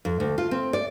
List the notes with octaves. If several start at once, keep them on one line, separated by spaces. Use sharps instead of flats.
F2
D2
F4
C4
D5